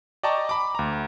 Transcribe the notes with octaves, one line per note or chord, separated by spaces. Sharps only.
D5 D#5 G5 A5 A#5 C#6
B5 D6
D2 A#5